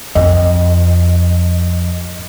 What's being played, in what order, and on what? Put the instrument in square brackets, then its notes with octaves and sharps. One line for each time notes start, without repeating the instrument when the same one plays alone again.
[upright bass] F2 [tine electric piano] D#5